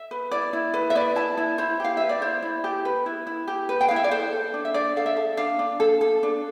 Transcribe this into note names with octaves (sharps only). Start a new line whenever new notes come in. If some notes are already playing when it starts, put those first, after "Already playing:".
Already playing: E5
B4
E4 D5
E4
B4
E5
B4 D5
E4 A5
E4
E4 C5
G4 F5
B4 E5
D5
E4 C5
E4
G4
B4
E4
E4
G4
B4
G5
E4 F5
E5
D5
A4 C5
A4
D4
E5
D4 D5
A4 F5
E5
A4
D4 F5
D4
A4
A4
D4